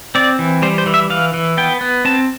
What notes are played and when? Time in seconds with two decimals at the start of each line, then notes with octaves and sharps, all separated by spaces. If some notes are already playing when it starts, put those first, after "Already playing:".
0.15 C4 D5
0.39 E3
0.62 G3 C5
0.78 C5
0.86 E3
0.94 E5
1.10 E3 F5
1.34 E3
1.57 B3 G5
1.81 B3
2.05 C4 A5